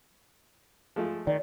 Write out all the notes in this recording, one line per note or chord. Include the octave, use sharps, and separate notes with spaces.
F3 G#3 A3
D#3 D5